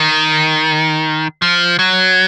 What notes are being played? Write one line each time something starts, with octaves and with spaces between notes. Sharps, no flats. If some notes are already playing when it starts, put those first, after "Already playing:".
Already playing: D#3
F3
F#3